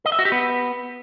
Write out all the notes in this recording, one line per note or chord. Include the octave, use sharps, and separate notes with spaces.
D#5
E5
F#4
G4
B3